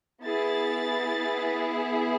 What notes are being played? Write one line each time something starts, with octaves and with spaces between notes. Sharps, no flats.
B3 E4 G#4 A6